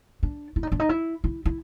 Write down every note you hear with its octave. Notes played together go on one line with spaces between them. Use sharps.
D4
E4
D#4
D4
D#4
E4
E4
E4